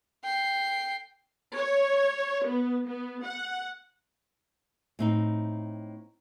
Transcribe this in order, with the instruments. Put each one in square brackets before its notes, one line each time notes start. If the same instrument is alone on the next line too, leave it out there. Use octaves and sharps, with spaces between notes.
[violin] G5 C7
[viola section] C#5
B3
B3
F#5
[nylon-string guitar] A2 C4 D#4